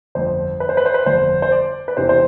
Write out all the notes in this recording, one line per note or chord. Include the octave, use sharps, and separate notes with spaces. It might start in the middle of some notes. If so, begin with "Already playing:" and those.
G1 F2 D3 C5
B4
C5
B4
C5
B4
G1 F2 D3 C5
C5
D5
B4
E1 E2 C3 E3 C5
C5